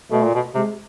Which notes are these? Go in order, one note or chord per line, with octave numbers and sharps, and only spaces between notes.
B2 A3
A#2
B2
C3 G#3